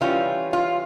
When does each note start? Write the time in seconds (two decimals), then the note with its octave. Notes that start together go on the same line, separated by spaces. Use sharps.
0.01 E3 G3 C#4 F4
0.53 F4